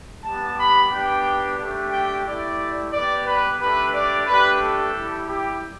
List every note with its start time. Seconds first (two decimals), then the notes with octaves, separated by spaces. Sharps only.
0.23 G3 B3 G4 A5
0.57 B5
0.91 B3 D4 G4 G5
1.58 A3 D4 G4
1.91 G5
2.25 A3 E4 G4 D5
2.91 B3 G4 D5
3.25 B4
3.58 A3 D4 G4 B4
3.93 D5
4.26 A3 D4 G4 B4
4.60 A4
4.94 G3 E4 G4
5.27 G4